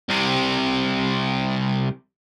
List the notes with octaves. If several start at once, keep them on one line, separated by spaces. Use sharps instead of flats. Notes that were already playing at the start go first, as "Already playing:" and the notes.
C2 C3